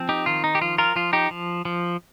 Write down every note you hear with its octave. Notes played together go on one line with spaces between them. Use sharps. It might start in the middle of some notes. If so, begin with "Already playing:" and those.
Already playing: F3 C4
D#4 G4
D#3 F4
D#4
G4
F3 F4
F4 A#4
F3 F4
D#4 G4
F3
F3